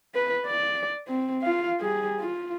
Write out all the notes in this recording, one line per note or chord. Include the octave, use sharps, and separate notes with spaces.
B4
D5
C4
F4 F5
G3 G#4
F4